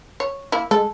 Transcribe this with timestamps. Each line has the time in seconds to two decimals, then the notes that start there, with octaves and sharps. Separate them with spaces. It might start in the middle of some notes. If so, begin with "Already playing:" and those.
0.20 C#5
0.52 A#3 E4
0.71 G#3 A4